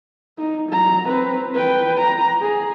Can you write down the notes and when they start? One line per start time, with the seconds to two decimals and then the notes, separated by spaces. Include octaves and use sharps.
0.38 D#4
0.69 F#3 A#5
1.07 C4 B4
1.54 B4 G5
1.98 A#5
2.41 G#4